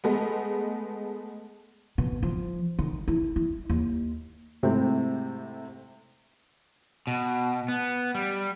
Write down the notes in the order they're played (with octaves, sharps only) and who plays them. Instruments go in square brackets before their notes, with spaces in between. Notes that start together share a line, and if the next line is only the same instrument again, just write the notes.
[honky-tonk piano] G#3 A3 B3
[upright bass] B2
F3
D#3
E4
E4
D#2
[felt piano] G#2 C3 A3 C4 E4
[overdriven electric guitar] B2
B3
G3